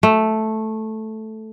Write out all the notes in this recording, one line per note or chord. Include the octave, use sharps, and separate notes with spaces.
A3